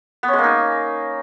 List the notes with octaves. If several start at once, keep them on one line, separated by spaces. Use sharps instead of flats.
B3
C#4
G#3
A#3
D#4